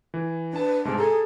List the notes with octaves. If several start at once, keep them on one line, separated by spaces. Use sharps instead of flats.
E3
D4 B4 A5
G#2 C3 G#3 A5
G#4 A4 A#5